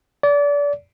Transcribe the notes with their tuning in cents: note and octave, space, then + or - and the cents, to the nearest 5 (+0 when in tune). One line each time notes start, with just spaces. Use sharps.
D5 -30